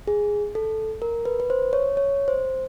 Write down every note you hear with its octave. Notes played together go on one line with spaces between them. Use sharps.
G#4
A4
A#4
B4
B4
C5
C#5
C#5
C5